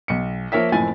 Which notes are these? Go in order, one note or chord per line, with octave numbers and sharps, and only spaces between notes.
B1 C#7
F3 A#3 A#4 C#5 E5 B6
F#1 A2 F3 C4 G#5 A6